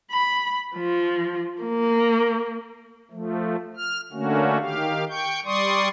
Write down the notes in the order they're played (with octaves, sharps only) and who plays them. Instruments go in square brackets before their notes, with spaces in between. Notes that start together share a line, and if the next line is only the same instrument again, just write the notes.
[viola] B5
F3
A#3
[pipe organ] F3 A3
F6
D3 A3 A#3 C#4 F#4
D#3 G4 F5
G5 C#6 G6
G3 D5 C6 C#6 D#6